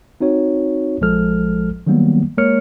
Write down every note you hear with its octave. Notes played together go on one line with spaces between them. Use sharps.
C4 D#4 F#4 C#5
A#1 F3 G#3 A4 F6
D#3 F#3 G3 A#3 B3
G#3 A#3 A#4 C#5 F6 C#7